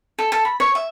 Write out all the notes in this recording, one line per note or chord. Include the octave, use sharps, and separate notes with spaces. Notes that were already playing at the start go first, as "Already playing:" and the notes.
A4
A4
B5
C#5
E5